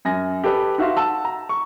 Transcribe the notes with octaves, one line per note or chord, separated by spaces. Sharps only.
F#2 G#5 A#6
G4 A4 B4 D#5
D#4 F#4 E5 F5 C6
F#5 A5 E6
A#5
C#6